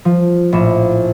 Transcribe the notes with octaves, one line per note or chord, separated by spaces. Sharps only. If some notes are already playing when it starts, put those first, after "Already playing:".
F3
A#1 A2 E7